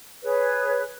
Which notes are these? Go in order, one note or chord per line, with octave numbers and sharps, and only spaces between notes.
G#4 B4 C#5